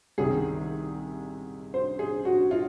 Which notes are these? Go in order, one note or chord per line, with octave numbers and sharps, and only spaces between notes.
C2 C3 D#3 G#4
C5
G#4
F#4
F4